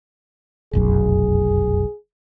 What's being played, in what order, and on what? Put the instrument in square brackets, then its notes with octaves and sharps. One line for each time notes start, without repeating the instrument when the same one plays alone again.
[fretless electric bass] F1 B1 F#2 [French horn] G#4